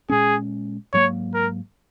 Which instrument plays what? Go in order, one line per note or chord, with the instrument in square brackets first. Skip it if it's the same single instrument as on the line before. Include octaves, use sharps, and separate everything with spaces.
[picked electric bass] A#2 G#3 C#4 [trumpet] G#4
[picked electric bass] G#2 F#3 A#3 [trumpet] C#5
[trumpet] A#4